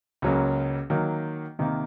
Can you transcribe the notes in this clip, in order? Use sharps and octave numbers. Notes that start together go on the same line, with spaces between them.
C#2 C#3 F#3 A#3 C#4
D#3 F#3 A#3
C3 D#3 A#3